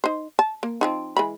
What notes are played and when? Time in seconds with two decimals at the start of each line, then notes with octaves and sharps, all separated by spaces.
0.04 D#4 C5
0.39 A5
0.63 A#3
0.81 F3 C4 D#4
1.17 E3 G#3 B5